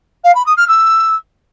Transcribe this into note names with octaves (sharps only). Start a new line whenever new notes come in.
F5
B5
D#6
F6
E6